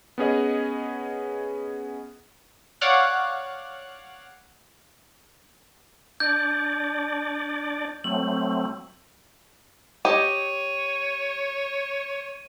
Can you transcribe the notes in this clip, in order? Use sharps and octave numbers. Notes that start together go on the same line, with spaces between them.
B3 C#4 G#4 D#5
C#5 D5 F5 F#5 F#6
D4 D5 G6
F#3 A3 C4 F#7
G4 C#5 D#5 D#7